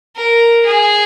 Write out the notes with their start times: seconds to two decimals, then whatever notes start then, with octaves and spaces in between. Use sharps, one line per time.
0.16 A#4
0.66 G#4